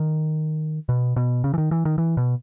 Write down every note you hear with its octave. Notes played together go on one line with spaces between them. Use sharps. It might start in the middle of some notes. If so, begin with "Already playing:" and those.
Already playing: D#3
B2
B2
C#3
E3
D#3
E3
D#3
E3
B2